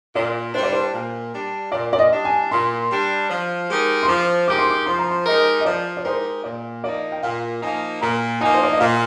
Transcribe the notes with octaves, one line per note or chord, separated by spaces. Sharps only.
A#2 D5
G3 D4 C5
D5
C5
A#2
G3 D4
A#2 D5
D5
D#5
G3 D4
G#5
A#2 C6
G3 D4
F3
G#3 D#4 G4 A#4
C6
F3 D6
G#3 D#4 G4 A#4 D6
C6
D6
F3 C6
A#5
C6
G#3 D#4 G4 A#4 D#5
D#5
F3 D5
D5
G#3 D#4 G4 A#4 C5
A#2 D5
F3 A#3 D#4 D5
G5
A#2 F5
F3 A#3 D#4 G#5
A#2 A#5
F3 A#3 D#4 G#5
C5
D5
D#5
A#2 F5